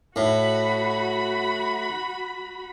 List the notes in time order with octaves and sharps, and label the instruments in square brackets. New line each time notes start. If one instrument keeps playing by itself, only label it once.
[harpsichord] A2 [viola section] F#4 B5